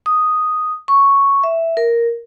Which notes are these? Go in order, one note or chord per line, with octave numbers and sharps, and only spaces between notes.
D#6
C#6
E5
A#4